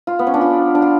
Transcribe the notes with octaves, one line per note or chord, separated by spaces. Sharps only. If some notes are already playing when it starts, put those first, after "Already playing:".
F4
B3
C#4
D4
F4
D4
F4